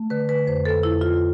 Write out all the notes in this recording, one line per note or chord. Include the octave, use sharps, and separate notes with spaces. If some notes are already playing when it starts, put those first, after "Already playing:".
Already playing: A3
D3 B4
B4
F2 C5
A4
F2 E4
F4